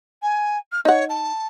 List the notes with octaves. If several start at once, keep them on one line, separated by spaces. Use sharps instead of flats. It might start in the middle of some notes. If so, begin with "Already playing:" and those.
G#5
F6
D#4 C#5 F#5
A5